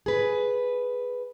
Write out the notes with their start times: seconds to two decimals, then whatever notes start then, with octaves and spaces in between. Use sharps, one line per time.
0.06 G#4 B4